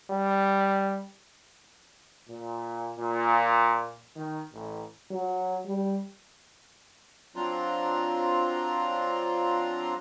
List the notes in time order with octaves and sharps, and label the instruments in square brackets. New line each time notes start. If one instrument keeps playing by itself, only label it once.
[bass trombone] G3
[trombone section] A#2
A#2
D#3
A1
[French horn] F#3
G3
[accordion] F#3 C4 D4 F4 A#5 C6